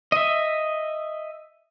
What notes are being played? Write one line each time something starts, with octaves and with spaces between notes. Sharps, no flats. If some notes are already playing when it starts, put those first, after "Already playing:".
D#5 E5